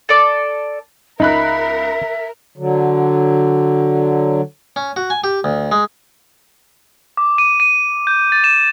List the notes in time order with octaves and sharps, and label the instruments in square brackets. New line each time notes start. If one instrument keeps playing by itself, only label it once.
[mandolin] A4 D5
[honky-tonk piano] C#2 B5 F#6 [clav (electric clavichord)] D#4 [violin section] A#4 [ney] E5
[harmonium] D3 F#3
[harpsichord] C#4
F#4
G#5
G4
D2
G#3
[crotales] D6
D#7
D#7
G6
A6
E7